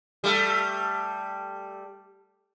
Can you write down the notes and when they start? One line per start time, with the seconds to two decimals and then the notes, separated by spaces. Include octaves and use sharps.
0.24 G3 A3